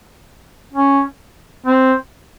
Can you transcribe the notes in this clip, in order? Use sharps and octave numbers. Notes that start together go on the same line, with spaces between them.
C#4
C4